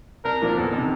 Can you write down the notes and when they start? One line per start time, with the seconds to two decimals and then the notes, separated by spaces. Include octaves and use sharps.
0.25 C2 A#4
0.42 A#2 F3 A#3
0.58 E2 A4
0.73 C3 D#3